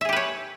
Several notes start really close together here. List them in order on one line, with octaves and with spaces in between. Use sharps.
E5 G#4 G4 B4 C#5